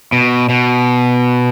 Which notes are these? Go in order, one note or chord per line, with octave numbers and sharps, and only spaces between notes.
B2
B2